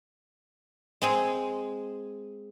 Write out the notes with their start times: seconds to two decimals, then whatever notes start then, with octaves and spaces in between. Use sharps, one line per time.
1.02 G#3 C4 G#4